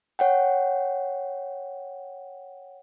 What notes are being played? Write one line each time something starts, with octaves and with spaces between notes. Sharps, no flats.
C#5 F#5 G5